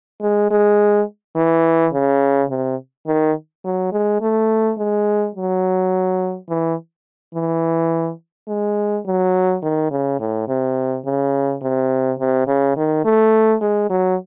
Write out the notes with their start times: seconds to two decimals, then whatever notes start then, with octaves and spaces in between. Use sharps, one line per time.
0.21 G#3
0.51 G#3
1.35 E3
1.93 C#3
2.50 C3
3.07 D#3
3.64 F#3
3.92 G#3
4.21 A3
4.78 G#3
5.35 F#3
6.49 E3
7.34 E3
8.48 G#3
9.05 F#3
9.63 D#3
9.91 C#3
10.19 A2
10.48 C3
11.05 C#3
11.62 C3
12.19 C3
12.47 C#3
12.77 D#3
13.05 A3
13.61 G#3
13.90 F#3